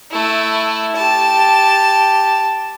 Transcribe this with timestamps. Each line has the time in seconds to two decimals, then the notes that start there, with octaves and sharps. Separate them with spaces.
0.11 A3 E4
0.96 G4 A5